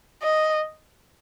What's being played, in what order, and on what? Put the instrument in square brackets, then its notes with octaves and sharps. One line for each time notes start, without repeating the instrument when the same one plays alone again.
[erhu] D#5